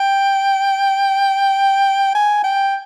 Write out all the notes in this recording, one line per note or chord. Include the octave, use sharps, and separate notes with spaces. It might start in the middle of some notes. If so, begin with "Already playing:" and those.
Already playing: G5
G#5
G5